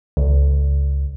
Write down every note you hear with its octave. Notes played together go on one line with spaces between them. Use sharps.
C#2